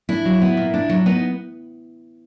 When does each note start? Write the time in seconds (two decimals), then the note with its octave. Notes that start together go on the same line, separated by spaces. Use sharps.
0.09 D4 E4
0.25 F#3
0.42 B3
0.57 A#2
0.74 D4
0.90 F#3
1.06 B3 D#4